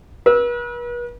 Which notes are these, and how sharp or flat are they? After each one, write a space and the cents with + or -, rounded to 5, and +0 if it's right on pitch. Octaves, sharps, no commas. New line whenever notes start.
B4 -40 E6 -15